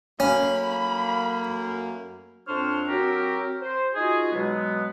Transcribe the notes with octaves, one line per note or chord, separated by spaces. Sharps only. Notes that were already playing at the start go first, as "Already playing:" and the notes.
F#2 A3 A#3 C#4 B5
F2 C4 D4 C5 C#5 F6
F#3 C4 F#4 G4 A#4
C5
D#4 F4 F#4 G#4
B2 F#3 G#3 B3